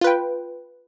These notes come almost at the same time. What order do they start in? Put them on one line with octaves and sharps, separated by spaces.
F4 B4 G5